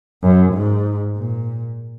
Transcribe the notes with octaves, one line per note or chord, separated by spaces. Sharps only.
F#2
G#2
A#2